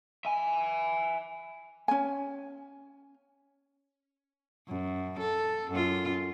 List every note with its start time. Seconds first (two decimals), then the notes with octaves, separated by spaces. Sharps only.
0.25 E5 G#5
1.88 C#4 G#5
4.68 F#2
5.18 A4
5.71 F#2 F4